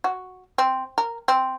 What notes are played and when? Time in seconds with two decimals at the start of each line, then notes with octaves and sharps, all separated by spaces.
0.04 F#4
0.58 C4
0.98 A#4
1.28 C4